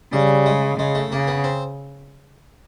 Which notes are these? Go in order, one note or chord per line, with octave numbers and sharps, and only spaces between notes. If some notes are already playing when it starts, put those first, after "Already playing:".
C#3 G3
G#3
C#3 G#3
A3
C#3 A#3
B3
C4